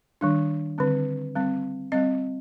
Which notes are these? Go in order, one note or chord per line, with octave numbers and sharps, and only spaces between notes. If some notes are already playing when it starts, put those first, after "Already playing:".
D#3 G3 D4
D3 G3 C4
G3 C4
G3 C4 D#5